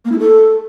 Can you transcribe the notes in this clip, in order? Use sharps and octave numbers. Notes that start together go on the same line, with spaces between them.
A#3
E4
A4